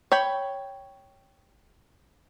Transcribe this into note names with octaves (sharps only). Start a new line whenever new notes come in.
C#5 G5 B5